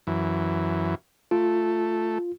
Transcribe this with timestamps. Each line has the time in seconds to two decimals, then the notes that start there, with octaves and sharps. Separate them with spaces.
0.07 F#2 E3
1.31 A3 F4